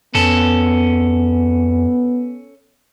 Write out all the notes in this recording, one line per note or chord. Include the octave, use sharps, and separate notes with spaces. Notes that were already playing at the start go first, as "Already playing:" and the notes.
F2 B3 C#4 A4